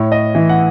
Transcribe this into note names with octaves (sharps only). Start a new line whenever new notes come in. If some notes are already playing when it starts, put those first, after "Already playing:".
Already playing: A2 C#5
D#5
E3
F#5